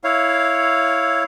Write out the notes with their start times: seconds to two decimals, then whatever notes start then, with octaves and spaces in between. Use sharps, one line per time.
0.04 E4 C#5 F5